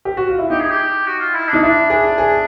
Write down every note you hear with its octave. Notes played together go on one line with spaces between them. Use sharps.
G4
F#4
F4
E4
D#4 G4
G#4
G4
F#4
F4
E4
D4 D#4
D4 E4
D4 G#4
G#4